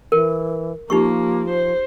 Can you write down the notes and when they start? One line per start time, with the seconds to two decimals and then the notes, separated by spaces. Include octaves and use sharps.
0.12 E3 A#4
0.90 F3 A#3 D#4 G4 C#6
1.49 C5